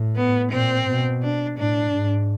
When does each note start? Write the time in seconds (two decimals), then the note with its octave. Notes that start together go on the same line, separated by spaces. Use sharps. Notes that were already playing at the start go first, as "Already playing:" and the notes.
Already playing: A2
0.16 B3
0.51 A#2 C4
0.87 B2
1.22 D4
1.58 A2 D4
1.92 G#2